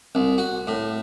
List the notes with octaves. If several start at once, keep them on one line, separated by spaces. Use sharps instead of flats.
C2
F#4
A2